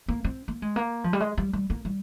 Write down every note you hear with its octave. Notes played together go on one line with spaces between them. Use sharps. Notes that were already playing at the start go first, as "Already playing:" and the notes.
A#3
C4
A#3
G#3
A#3
F3
G3
G#3
G3
G3
A#3
G3